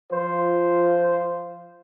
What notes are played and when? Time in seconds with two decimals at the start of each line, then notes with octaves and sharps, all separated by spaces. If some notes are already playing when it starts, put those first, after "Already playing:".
0.11 F3 F4 C5